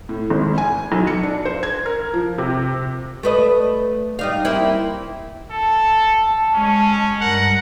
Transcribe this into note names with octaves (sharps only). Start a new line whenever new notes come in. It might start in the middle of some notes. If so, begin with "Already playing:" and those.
A2
G#1
G#5
B1
C#7
D4
C5
G#6
A#4
F3
C3
A3 B4 D#5
G3 D#4 F5
A#3 C4 E4
A4 A5
G#3 C#4
G2 A#4 F#5